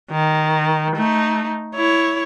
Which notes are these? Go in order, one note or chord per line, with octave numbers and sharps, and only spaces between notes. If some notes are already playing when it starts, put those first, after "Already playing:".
D#3
A3 D#4
E4 C#5